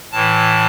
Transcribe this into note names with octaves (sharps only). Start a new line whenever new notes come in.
A2 E3 A5